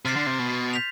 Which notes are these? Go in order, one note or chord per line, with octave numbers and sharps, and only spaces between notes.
C3 C6 F6 A6 C7 E7
D3
C3
B2
G6 B6 F7